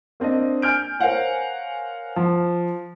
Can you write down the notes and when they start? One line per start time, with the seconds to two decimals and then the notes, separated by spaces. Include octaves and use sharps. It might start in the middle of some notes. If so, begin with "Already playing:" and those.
0.20 A#3 C4 D4 D#5
0.62 G#5 F6 G6 D7
1.00 A#4 C5 C#5 F5 F#5 G#5
2.16 F3